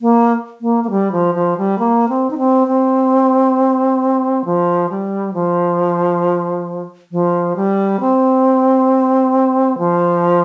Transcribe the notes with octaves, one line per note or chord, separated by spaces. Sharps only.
A#3
A#3
A#3
G3
F3
F3
G3
A#3
C4
D#4
C4
C4
F3
G3
F3
F3
G3
C4
F3